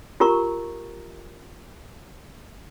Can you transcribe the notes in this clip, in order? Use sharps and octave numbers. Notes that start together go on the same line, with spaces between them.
F4 G4 A#4 A#5 C#6